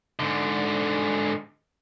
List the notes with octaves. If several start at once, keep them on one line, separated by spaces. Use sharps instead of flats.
G#2 D3